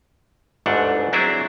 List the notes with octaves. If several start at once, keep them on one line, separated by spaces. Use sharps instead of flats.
G1 D2 G#2 A3 D4 F#5
F#3 C4 D4 E4 G#4 E5